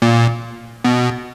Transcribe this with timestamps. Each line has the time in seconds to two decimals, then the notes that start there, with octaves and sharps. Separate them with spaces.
0.02 A#2
0.84 B2